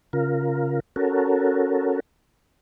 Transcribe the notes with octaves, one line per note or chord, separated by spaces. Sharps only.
C#3 F4 A#4
C#4 F#4 A4 A#4